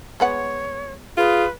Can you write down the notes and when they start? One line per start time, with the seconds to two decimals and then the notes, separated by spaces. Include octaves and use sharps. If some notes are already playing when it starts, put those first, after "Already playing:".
0.20 G#3 B3 C#5 F#5
1.17 F4 G#4 B4